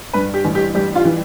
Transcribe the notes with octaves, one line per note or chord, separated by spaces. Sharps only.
G2 B4
G4
A1
G4
G3 G4
F4
E3